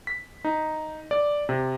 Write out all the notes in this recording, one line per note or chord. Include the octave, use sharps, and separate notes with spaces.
B6
D#4
D5
C3